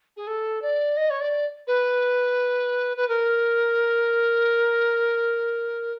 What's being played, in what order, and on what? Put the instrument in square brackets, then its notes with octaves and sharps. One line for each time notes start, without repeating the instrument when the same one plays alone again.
[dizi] G#4
A4
D5
D#5
C#5
D5
B4
B4
A#4